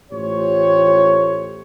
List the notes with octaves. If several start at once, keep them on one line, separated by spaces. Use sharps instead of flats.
A1 A2 F4 G4 C5 C#5